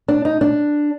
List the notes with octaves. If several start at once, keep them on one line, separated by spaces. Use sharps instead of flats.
D4
D#4
D4